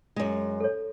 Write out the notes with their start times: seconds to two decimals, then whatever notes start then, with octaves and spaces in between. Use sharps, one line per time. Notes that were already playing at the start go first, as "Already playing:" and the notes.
0.16 F#2 G#3
0.60 A4 C#5